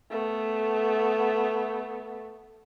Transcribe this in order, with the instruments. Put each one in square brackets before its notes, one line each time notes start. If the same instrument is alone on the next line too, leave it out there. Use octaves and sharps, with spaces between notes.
[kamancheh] A3 B3